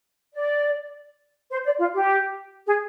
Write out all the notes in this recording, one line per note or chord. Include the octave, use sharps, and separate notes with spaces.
D5
C5
D5
F4
G4
G#4